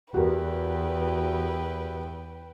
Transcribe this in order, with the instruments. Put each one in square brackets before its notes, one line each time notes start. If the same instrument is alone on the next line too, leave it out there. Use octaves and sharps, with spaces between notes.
[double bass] E2 [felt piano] F#4 G4 A#4 [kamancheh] B4 G5